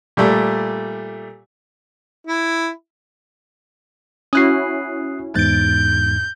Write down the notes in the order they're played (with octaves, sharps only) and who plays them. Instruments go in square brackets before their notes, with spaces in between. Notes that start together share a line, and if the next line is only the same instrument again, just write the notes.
[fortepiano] A#2 G3 A3
[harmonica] E4
[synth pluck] C#4 E4 F#4 [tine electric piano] D#6 F#6 C7
[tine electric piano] E2 G#2 [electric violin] G6 [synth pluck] A6 D7